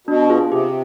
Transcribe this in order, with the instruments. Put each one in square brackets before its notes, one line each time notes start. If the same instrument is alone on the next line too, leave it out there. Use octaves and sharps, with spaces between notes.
[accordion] B2 [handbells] D4
[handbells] F4 G#4
[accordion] C3 [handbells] G4